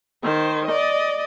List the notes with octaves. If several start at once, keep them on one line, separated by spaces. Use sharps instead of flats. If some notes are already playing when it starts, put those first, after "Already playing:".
D#3 C5
D5 D#5